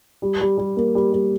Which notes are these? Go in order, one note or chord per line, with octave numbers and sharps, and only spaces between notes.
G3
G3
G3
A#3
G3
G3